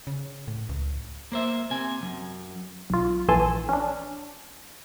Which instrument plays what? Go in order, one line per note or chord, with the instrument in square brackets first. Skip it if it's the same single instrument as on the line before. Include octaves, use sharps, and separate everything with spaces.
[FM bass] C#3
A2
C#2
[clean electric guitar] A#3 C5 E5
C3 G#5
F#2
[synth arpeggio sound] B1 F4
A#1 E3 A4 G#5 A5 C6
C#4 D4